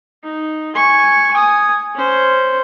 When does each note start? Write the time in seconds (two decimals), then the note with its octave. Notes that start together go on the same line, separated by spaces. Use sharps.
0.24 D#4
0.75 G#5 C#6
1.33 G#5 D#6
1.95 C#4 C5